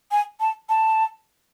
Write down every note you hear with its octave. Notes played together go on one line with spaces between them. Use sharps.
G#5
A5
A5